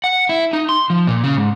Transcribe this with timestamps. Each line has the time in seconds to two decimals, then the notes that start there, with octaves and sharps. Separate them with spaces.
0.04 F#5
0.29 E4
0.53 D#4
0.69 C6
0.90 F3
1.07 A#2
1.24 C#3
1.37 G#2